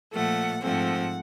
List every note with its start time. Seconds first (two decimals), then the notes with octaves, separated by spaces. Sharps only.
0.13 A#2 F3 A3 F#5
0.62 G#2 F3 A3 C4 F#5